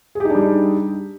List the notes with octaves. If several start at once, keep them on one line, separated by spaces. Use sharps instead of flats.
G3 D4 D#4 G4 G#4